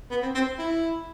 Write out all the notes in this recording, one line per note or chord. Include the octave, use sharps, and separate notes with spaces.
B3
C4
C4
E4